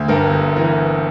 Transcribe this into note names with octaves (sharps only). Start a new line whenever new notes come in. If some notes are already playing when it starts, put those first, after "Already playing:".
Already playing: D2
G2 A#4
G1
A#3
E3 A#4